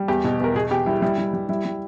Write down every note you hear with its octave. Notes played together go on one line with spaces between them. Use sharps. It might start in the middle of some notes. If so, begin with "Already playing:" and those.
Already playing: G3
E2 G4
B2
E2 A#4
B2 G#4
E2 G4
G3 E4
G3 E4
G3
G3
G3 E4
G3